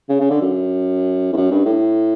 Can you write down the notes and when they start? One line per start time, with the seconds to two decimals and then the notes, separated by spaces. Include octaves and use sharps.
0.09 C#3
0.20 C#3
0.30 D3
0.41 F#2
1.33 E2
1.37 F#2
1.51 G2
1.66 A2